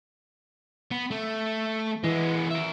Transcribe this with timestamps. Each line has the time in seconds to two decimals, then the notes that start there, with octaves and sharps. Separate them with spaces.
0.91 B3
1.11 A3
2.04 E3 G#3 B3
2.51 A#4 E5